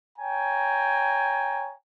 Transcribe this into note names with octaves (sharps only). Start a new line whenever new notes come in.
C#5 G5 G#5 A#5